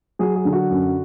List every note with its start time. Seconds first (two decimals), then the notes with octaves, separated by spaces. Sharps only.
0.19 F#3 G#4
0.36 G#4
0.45 D3
0.53 F#4
0.70 F#2